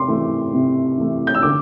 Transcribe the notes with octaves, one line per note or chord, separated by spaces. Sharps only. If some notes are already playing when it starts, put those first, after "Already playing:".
Already playing: C3 C6 D6
E3 A3
C3
E3 A3
G6
E6
D3 D6